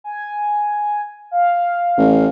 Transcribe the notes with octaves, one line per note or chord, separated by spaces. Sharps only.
G#5
F5
A1